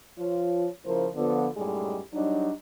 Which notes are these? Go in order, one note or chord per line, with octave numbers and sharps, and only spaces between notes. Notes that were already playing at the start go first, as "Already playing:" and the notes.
F3 F4 C#5
C#3 F3 A#3 E4 A#4 C5
D3 F3 B3
F#2 A2 G3 G#3 D#4 G#4
F#3 G3 D4 D#4